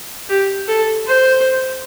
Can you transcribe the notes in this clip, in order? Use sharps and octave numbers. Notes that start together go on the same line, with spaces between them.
G4
A4
C5